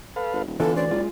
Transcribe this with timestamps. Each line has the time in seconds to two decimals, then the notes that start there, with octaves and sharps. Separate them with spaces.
0.16 A4 B4 F5
0.33 G#1
0.47 D#1
0.60 D3 E3 B3 F4 A4
0.76 D2 C#4 C5 D5
0.91 F#1 G#3 F4